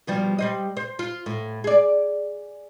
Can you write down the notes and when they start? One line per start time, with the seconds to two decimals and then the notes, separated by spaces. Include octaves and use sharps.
0.07 B2 F3 G3
0.39 G3 C5 D#5
0.77 C5
0.99 F4
1.26 A2
1.64 G#4 D5